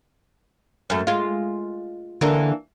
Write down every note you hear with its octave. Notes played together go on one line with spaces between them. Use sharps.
F#2 A3
G#3 F4
D3 E3 A#3 D4